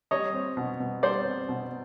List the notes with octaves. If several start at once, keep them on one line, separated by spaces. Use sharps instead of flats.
G3 C#5 D#5
C4
B2
B2
G3 C5 D5
C4
B2